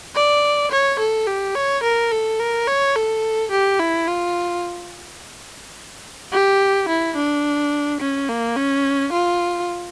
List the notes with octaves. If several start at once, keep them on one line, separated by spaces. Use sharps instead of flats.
D5
C#5
A4
G4
C#5
A#4
A4
A#4
C#5
A4
G4
E4
F4
G4
E4
D4
C#4
A#3
C#4
F4